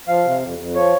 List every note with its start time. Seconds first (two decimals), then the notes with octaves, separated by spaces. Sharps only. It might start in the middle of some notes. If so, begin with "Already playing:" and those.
0.08 F3 F5
0.25 C3
0.42 F2
0.59 F2
0.75 F3 C#5